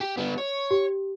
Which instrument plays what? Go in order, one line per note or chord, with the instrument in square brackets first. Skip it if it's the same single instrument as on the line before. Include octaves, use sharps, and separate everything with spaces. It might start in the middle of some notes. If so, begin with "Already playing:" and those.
[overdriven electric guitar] G4
G3 B3
C#5
[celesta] G4